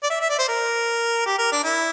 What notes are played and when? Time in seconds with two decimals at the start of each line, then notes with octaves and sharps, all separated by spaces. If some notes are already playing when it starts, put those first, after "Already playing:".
0.03 D5
0.10 E5
0.21 E5
0.30 D5
0.39 C5
0.49 A#4
1.26 G4
1.38 A#4
1.52 D4
1.64 E4